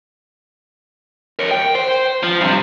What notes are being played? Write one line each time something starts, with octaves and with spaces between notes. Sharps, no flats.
A#4 C#5
G5
C5
F3
G2 C3